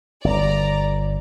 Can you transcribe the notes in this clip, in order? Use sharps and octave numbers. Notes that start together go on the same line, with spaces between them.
G1 D5 A#5